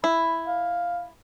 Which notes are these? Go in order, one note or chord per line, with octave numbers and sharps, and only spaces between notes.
E4 B5
F5